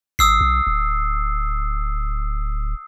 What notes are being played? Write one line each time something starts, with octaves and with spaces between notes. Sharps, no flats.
G#1 D#6 E6 C7
B1
D1